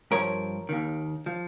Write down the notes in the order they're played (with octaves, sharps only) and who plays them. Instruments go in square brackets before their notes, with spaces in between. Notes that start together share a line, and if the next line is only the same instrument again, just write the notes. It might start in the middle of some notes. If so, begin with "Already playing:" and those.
[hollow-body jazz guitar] G2 F3 A#4 C#5
D#2 D#3
F3